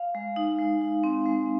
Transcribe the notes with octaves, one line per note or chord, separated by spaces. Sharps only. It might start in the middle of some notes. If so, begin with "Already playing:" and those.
Already playing: F5
G#3
D#4
G#3
D#4
C4
G#3